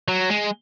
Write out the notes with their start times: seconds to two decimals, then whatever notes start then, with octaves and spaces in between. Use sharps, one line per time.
0.08 F#3
0.30 G#3